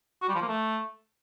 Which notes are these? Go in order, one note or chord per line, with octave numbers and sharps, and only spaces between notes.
F#4
G3
F3
A#3
A3